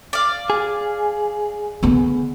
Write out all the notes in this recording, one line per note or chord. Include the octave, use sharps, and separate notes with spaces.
D5 F5
G#4
D3 B3